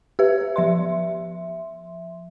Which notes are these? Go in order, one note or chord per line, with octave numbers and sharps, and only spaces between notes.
G4 B4 E5
F3 E5 C6